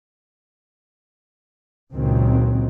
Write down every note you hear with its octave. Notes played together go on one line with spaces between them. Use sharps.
C#2 A#2 D#3 F#3 C4